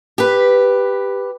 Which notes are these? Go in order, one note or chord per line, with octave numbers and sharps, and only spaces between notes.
G4 B4